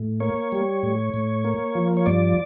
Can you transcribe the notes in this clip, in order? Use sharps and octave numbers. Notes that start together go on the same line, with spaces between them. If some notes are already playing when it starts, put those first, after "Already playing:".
Already playing: A2
A#3 C#5
G3
A2
A2
A#3
F3
C#5
G2 D5